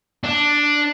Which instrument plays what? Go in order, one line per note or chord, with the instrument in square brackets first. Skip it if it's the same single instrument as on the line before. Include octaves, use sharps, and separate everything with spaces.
[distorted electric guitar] D4